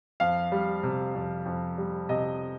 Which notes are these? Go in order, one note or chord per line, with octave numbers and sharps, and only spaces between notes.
F2 F5
G3
C3
F2
F2
G3
C3 D#5